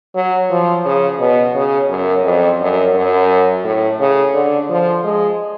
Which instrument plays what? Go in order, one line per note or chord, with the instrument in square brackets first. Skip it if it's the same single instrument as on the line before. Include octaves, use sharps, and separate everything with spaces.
[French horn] F#3
F3
C#3
B2
C#3
F#2
F2
F#2
F#2
A2
C#3
D3
F3
G#3